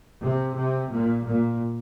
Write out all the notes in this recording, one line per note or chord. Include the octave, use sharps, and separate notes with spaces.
C3
C3
A#2
A#2